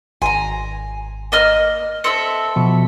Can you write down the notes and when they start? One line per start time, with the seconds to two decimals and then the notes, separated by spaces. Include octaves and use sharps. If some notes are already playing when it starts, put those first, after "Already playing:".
0.22 G#1 G#5 A#5 C6
1.32 A#3 D#5 F6
2.04 C4 A4 E5 C#7
2.56 B2 F3